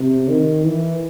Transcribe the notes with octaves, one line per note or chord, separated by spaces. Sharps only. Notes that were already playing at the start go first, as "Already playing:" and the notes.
Already playing: C3
D#3
E3